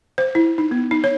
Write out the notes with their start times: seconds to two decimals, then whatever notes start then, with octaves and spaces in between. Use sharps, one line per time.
0.18 C5
0.35 E4
0.58 D#4
0.71 B3
0.91 D#4
1.04 C#5